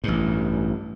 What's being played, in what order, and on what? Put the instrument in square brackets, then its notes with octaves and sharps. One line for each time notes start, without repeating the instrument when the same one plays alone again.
[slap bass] A1 G2